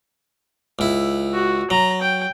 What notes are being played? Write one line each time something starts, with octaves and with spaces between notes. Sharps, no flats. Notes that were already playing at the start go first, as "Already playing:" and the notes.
C#2 E4
F#4
F#3 A#5
G5